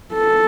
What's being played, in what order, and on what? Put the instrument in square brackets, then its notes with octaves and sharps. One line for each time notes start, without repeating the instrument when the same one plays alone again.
[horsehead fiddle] A4